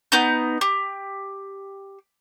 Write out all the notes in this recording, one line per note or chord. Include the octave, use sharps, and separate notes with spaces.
B3 D#4 G6
G4